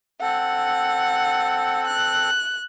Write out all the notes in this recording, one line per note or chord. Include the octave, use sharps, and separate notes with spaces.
C4 A4 F#5
F#6